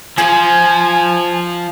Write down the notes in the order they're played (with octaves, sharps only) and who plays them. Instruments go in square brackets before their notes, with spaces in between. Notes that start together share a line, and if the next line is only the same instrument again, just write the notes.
[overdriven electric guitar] F3 F4 [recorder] G#5